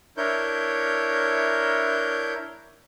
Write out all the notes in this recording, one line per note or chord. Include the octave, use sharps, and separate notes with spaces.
D4 E4 A#4 C#5 G6